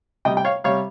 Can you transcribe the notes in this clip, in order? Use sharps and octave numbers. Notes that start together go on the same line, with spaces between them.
C3 G3 D#5 G5
G5
C#5 F5
C3 G3 C#5 F5